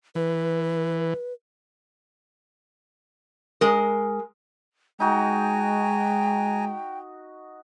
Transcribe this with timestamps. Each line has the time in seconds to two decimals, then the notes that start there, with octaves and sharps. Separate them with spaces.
0.15 E3 B4
3.61 G#3 A#4
5.00 G#3 D#4 F#4 G5 G#5 A#5